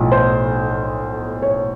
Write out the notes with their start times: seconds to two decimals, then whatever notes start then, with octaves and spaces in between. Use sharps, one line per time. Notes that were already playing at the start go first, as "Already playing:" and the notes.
Already playing: B1 A2 F3
0.12 C5
1.42 C#5